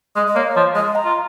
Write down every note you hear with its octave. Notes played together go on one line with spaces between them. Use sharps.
G#3 D#5
D#5
A#3 C#5
F3
G#3 D#5
A#5
F4